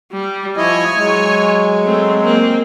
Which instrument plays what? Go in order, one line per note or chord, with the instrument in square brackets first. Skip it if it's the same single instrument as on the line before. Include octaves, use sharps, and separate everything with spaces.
[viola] G3
[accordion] F3 E4 D#5 [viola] C#5 G#5
[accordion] F#3 G#3
[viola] A3 C4
A#3 C4